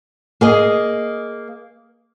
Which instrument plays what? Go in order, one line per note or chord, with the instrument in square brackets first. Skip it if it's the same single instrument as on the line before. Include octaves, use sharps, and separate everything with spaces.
[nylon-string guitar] A#3 G#4 D#5